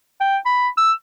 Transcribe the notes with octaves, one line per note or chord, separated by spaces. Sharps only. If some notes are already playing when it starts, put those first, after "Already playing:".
G5
B5
E6